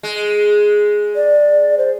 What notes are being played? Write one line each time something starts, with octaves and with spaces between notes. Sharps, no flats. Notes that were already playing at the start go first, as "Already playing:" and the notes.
G#3
D5
C5